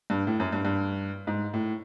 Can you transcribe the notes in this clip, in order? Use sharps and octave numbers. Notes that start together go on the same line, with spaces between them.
G2
A2
F#2
G2
G2
G#2
A2